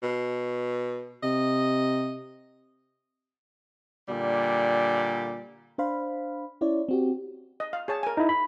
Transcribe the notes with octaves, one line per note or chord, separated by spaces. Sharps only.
B2
C3 D#5
A#2 D3 G3
D4 C5 F5 B5
C#4 E4 C#5 D5
C4 F#4 G4
D#5
F5
G#4 C#5 A5
A#4 G#5
D#4 E4
B5